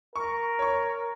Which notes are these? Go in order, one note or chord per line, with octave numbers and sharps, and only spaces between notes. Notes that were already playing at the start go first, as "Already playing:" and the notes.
A#4 C#6
C#5 C#6